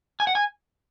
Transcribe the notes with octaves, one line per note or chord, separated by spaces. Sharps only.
G#5
F#5
G#5